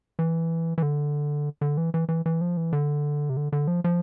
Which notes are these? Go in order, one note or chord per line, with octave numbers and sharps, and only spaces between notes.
E3
E3
D3
D3
E3
E3
E3
E3
F3
E3
D3
C3
D3
D3
F3
F3